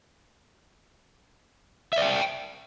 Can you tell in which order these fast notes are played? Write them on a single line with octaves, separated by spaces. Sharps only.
E5 D5 G5